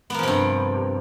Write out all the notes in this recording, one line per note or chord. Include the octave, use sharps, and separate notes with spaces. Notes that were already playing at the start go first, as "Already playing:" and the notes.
G2 C3 F3 A#3 B3